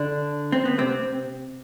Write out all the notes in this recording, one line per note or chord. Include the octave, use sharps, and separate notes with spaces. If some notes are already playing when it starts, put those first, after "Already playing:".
Already playing: D3 D4
C4
B3
C3 C4